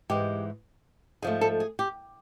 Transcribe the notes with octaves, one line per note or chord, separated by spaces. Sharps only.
G#2 E3 G#3 G4
G#2 F3 A3 G#4
A4
G#4
G4